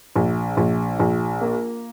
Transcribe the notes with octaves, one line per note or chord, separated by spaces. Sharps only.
A#1
A#1
A#1
A#3